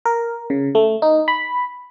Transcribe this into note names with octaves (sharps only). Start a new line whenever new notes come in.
A#4
C#3
A3
D#4
B5